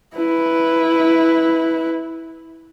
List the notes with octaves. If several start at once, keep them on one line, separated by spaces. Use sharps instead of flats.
E4 B4